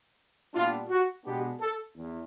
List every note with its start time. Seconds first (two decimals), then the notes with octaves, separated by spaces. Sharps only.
0.54 A#2 G3 B3 D4 F4
0.90 F#4
1.25 B2 G#3 B3 D4 G4
1.61 A4
1.96 E2